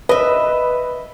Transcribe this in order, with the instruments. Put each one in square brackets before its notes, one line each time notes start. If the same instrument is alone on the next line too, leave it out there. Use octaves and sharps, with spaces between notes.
[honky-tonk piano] B4 [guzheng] D#5 E5